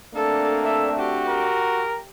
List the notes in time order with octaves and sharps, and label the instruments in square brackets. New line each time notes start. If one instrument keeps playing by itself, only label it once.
[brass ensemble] A3 C4 D4 [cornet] A#3 [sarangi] A4
[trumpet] A4 [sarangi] E5
[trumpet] F#4 [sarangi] G4
[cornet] A#4